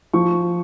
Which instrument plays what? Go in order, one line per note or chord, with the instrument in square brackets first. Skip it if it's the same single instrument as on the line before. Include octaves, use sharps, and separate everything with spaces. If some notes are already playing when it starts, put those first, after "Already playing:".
[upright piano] F3 C#6